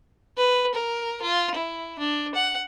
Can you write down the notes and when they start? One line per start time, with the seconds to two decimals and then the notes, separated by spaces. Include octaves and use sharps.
0.38 B4
0.74 A#4
1.22 F4
1.55 E4
1.99 D4
2.35 F#5